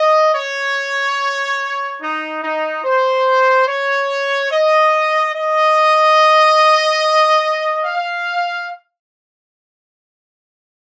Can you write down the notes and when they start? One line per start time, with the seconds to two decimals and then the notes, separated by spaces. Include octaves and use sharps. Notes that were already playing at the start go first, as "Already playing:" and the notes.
Already playing: D#5
0.35 C#5
2.01 D#4
2.43 D#4
2.84 C5
3.68 C#5
4.51 D#5
5.34 D#5
7.84 F5